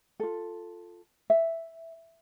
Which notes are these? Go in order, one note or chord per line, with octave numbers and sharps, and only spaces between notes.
F4 A4
E5